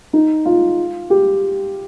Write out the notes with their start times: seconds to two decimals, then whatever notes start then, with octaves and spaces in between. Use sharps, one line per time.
0.13 D#4
0.45 F4
1.10 G4